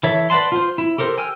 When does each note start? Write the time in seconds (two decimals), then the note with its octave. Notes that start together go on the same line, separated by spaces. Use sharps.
0.03 E3 A4 C#5 E5
0.30 B4 D5 F#5 A5 C6
0.52 F4 C5
0.78 E4
0.98 G4 A4 A#4 C5
1.18 G5 G#5 E6 F6